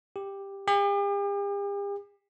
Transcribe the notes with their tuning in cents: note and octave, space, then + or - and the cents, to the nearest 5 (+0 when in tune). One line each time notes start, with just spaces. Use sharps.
G4 +10
G4 +45